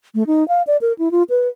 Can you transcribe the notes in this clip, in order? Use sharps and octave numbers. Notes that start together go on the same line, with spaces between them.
A3
D#4
F5
D5
A#4
E4
F4
B4